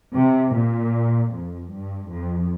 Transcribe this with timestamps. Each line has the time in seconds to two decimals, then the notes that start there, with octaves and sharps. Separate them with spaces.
0.15 C3
0.55 A#2
1.33 F2
1.73 G2
2.12 F2